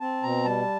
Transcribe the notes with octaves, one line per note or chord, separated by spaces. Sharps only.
C4 A5
B2 A#5
G3 A5